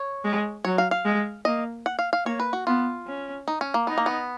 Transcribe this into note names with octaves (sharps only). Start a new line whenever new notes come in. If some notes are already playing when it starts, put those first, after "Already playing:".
Already playing: C#5
G#3
F#3 C#5
F5
F5
G#3
A#3 D#5
F#5
F5
F5
A#3 C#5
B4
F#4
B3 F4
C#4
D#4
C#4
A#3
B3 D#4
A#3
B3